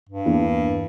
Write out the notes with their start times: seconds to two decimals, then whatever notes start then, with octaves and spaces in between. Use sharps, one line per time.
0.09 G2
0.25 E2 E3 A#3 D4